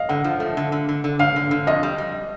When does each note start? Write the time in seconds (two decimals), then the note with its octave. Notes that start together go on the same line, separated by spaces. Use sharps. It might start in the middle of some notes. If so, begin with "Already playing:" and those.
Already playing: D#5 F5
0.09 D3 F#5
0.24 F3
0.40 A3
0.57 D3
0.72 D3
0.89 D3
1.04 D3
1.19 D3 F5
1.36 D3
1.51 D3
1.67 F2 D#5
1.83 G3
1.98 G3